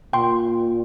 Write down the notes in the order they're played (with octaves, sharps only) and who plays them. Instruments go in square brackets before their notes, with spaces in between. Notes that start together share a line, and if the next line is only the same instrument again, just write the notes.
[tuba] A#2 [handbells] G5 C6